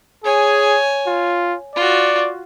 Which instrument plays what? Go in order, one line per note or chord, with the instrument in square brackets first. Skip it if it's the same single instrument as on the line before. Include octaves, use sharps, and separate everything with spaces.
[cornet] G#4 [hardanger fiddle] C#5 G#5
[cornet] F4
[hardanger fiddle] F4 F#4 [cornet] D5